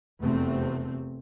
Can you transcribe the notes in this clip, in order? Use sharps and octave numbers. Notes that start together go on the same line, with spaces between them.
F1 E2 C3 A3 C4